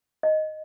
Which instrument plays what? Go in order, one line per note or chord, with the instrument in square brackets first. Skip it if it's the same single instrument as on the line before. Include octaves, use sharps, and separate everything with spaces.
[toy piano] D#5